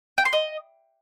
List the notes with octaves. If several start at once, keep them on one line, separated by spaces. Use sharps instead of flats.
G5
C6
D#5